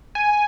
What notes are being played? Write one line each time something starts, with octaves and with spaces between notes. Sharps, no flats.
G#5